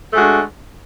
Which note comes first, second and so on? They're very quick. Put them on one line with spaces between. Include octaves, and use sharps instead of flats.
A3 G#3 F#4 D4